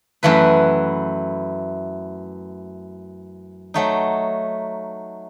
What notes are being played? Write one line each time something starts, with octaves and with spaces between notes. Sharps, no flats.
F#2 E3 A3 E4 B4
F#3 A3 D#4